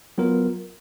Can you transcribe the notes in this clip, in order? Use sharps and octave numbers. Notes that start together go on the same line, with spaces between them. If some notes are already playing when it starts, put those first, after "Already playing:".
F#3 B3 F4 A#4